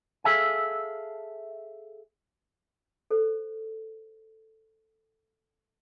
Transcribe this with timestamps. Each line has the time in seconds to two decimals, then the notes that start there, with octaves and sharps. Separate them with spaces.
0.24 G#4 A4 E5 F5 G#5
3.11 A4 C5